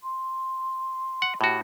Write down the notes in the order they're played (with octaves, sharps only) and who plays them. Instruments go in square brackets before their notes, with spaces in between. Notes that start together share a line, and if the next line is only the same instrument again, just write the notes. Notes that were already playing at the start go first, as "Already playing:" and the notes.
[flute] C6
[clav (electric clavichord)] F#5
[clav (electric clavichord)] A2 F#4 [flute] G4